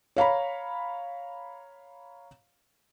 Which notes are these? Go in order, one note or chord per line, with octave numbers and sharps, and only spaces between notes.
C#5 F5 A#5 B5